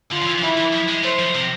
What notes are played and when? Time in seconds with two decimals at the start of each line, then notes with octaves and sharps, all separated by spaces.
0.12 D3 F4
0.22 F3
0.27 E3
0.38 F3
0.42 E3 E4
0.58 E3
0.73 F3
0.88 G#3
1.03 A3 C5
1.19 F3
1.34 C3